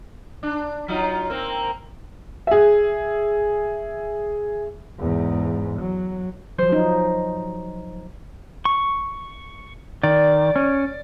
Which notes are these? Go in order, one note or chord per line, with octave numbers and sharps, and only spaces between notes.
D4
F#3 D#4 F4
A#3 C4
G#4 E5
E2 G#2
F#3
F3 F#3 C5
D#4
C#6
D#3 D5
C#4